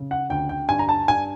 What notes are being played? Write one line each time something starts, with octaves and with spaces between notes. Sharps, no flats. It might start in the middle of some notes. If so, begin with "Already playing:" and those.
Already playing: C#3
F#5
D2 G5
G5
G2 G#5
A#5
A5
G2 G#5